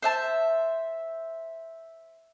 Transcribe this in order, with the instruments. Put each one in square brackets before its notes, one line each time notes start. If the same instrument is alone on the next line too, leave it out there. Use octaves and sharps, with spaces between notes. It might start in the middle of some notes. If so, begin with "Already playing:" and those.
[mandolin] C5 E5 A5